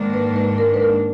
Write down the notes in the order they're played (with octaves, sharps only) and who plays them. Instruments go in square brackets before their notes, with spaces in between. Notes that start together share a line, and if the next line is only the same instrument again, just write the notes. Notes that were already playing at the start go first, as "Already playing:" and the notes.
Already playing: [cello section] G#2 D#3 A#3 D4
[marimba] B4
B4
A#4
B4
A#4